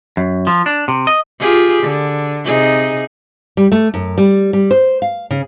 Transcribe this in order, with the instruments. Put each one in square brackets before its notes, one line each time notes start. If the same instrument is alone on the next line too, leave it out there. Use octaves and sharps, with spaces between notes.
[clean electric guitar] F#2
F3
D4
C3
D#5
[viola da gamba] F4 G4 G#4
D3
C3 D#4 G#4
[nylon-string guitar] G3
A3
F#2
G3
G3
C5
F5
C#3